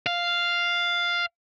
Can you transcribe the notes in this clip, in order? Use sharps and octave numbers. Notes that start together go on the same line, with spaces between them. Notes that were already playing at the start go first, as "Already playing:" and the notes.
F5